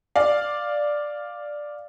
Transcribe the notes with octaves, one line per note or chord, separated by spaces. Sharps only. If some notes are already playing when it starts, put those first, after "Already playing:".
D5 F5